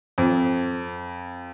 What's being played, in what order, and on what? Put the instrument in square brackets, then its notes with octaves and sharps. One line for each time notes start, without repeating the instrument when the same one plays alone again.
[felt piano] F2